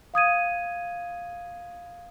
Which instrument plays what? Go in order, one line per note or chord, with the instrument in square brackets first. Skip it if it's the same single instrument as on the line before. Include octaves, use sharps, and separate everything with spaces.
[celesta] F5 D#6 G#6 D#7